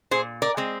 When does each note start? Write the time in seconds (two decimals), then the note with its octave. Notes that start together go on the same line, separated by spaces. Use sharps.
0.11 A#2 G#4 C5
0.42 A#4 D5
0.57 G#3 C4